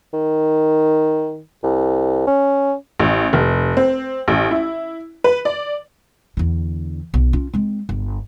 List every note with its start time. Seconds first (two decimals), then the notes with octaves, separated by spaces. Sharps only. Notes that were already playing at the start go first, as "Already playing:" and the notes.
0.13 D#3
1.63 C2
2.27 C#4
2.99 A1
3.33 F1
3.77 C4
4.28 A1
4.51 E4
5.24 B4
5.45 D5
6.37 E2 D3
7.14 B1
7.33 C#4 F4
7.53 G#3 C4
7.89 G1